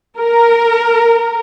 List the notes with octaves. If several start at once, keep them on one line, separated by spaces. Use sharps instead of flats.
A#4